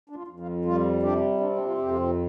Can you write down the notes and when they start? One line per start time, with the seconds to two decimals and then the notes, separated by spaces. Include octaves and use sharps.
0.09 D4
0.15 F4
0.27 F2
0.40 F4
0.65 G3 F4
1.03 C3 D4 G4
1.40 C4 D4
1.56 D4
1.65 F4
1.78 F2 G4
1.90 F4